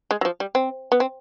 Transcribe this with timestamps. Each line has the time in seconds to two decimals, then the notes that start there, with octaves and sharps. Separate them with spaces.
0.11 G#3
0.21 F#3
0.25 F3
0.40 G3
0.55 C4
0.92 B3
1.00 C4